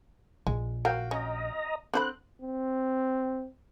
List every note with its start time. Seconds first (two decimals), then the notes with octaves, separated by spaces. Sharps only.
0.47 A#1 G#3
0.85 F#3 F#4 A#4 F5 G5
1.11 C#4 D#5 A#5
1.94 D3 C4 C5 B5 F#6
2.42 C4